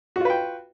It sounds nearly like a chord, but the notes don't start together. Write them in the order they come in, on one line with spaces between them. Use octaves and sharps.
F#4 F4 B4 G5